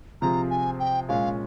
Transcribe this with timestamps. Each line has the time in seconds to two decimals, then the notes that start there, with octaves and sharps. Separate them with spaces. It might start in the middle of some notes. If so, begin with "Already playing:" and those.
0.22 C3 F3 C4 F4 G#4 A#5
0.50 G#5
0.80 G5
1.09 A#2 G#3 C#4 F4 F5